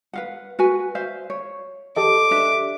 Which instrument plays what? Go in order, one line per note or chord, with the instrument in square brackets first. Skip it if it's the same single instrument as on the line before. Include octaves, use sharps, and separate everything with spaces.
[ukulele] B4 F5 F#5
F#4 B4 G#5
C5 E5 F5
C#5
[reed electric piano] G4 A4 D#5 [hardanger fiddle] D6
[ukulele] D4 B4 E5